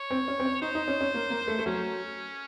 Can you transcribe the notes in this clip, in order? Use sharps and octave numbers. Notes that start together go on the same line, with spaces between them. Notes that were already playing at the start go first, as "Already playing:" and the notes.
Already playing: C#5
C4
C#4
C4
C#4
D#4 C5
D#4
C#4
C#4
A#3
A#3
A3
A3
F#3 C#4